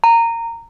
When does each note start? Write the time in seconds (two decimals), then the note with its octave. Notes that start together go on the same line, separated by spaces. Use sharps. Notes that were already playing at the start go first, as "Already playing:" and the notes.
0.04 A#5